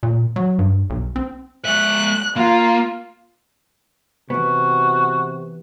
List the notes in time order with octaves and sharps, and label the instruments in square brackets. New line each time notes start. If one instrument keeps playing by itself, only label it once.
[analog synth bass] A#2
F#3
G2
B1
C4
[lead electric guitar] G#3 E5 [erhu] F#6
[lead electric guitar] A#3 [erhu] F4
[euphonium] C3 [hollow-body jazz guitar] E3 B3 [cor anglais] F#4